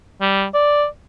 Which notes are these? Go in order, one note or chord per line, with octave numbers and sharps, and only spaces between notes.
G3
D5